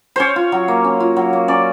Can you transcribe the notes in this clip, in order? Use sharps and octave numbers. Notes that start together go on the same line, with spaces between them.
C#4 C5 C#5
F4
F#3
A#3
C#4
F4
F#3
A#3
C#4 D5